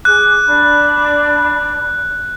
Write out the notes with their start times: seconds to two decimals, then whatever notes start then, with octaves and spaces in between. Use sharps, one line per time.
0.05 G#4 D6 F#6
0.47 D4 B5